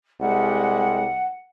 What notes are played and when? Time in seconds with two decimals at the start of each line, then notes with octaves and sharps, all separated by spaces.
0.21 C2 G3 G#3 F#5